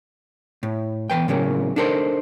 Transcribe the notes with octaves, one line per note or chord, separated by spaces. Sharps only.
A2
E2 E3 B4 G5
A2 C#3 F#3 A#3
D4 D#4 A4 A#4 C5